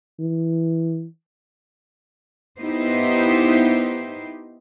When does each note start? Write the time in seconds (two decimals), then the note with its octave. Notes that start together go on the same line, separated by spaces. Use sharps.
0.19 E3
2.59 B3 D#4 E4 G4 C5